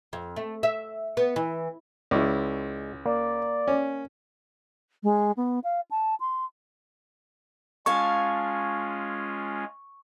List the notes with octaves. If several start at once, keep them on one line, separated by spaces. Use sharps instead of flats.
F2
A3
E5
B3
E3
C#2 G#3 E4 C#5 D5
A#3 D5
C#4
G#3
B3
F5
A5
C6
G#3 C#4 F4 F5 G#5 A5 C#6